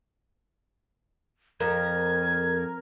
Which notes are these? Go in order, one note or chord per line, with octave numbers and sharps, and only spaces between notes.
F2 A#4 G#6